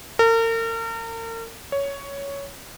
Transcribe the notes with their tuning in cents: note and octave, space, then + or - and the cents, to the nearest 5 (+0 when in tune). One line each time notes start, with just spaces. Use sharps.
A#4 -40
C#5 +10